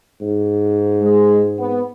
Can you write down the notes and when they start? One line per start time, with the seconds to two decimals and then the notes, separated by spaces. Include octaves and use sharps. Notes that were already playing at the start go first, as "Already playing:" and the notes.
0.21 G#2
1.02 G#3
1.58 B3